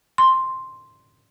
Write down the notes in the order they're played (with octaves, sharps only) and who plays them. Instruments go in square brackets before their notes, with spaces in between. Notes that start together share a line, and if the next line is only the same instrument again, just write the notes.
[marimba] C6